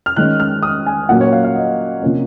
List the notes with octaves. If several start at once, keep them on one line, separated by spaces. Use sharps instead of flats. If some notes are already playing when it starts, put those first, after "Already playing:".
F6
D#3 G#3 C#4 F#6
F6
D#6
G#5
A#2 F#3 A#3 C#4 F#5
C#5
F5
F5
D#5
C3 F3 A#3 C#4